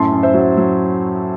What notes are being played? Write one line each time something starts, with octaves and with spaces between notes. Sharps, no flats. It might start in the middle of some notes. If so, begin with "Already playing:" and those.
Already playing: F#2 A2 A5 C6
F#2
C5 E5
F#3
F#3